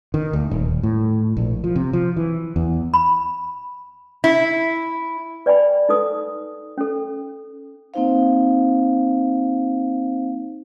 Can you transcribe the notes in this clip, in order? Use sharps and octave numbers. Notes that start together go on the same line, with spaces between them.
D#3
D2
D#1
A2
A#1
F3
C3
F3
E3
E2
B5
E4
B4 D5 G5 G#5 B5
D#4 A4 B4 D#6
C#4 A4
A#3 C4 D#4 C5 F5